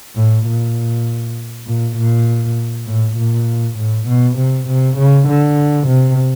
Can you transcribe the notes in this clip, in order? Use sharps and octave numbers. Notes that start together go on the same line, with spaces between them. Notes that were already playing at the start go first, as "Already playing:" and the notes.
A2
A#2
A#2
A#2
A2
A#2
A2
B2
C3
C3
C#3
D3
C3